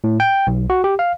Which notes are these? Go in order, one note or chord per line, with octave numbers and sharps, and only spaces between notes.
A2
G5
B1
F#4
G4
F5